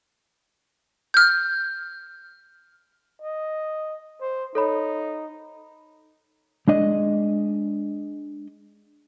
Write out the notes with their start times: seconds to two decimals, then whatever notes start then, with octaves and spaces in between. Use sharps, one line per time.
1.14 F6 G6
3.22 D#5
4.21 C5
4.55 D#4 A4 C#5 B5
6.68 G#3 D4 D#5